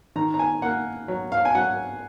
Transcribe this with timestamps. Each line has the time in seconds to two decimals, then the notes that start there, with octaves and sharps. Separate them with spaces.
0.16 D#3 A#5
0.34 A#5
0.39 G#5
0.62 A#3 F#5
1.08 F#3
1.32 F5
1.45 G#5
1.55 F#3 F#5